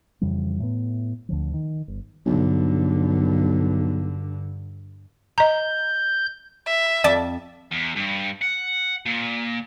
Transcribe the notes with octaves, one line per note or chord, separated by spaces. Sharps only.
F2 C#3 E3 G3
A2 B3
D2 D3 F3
D#3
G1
B1 G2 D3
D#5 A#5 G6
E5
F2 D5 A5
E2
G2
F#5
A#2